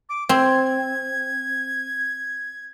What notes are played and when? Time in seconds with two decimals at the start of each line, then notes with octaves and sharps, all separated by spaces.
0.09 D6
0.29 C4 G#6